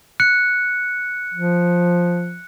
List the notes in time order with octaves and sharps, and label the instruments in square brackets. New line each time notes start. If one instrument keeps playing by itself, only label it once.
[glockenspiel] F#6 C#7
[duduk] F3